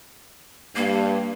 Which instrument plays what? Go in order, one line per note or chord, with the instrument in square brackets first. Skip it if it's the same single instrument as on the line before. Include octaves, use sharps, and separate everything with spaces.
[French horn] G2 [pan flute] A#3